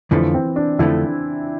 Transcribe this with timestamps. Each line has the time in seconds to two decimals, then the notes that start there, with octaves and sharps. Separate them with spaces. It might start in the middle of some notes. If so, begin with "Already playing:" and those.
0.11 F2 D3 E3 F3 A3
0.34 C4
0.56 D4
0.79 F2 D3 F3 A3 E4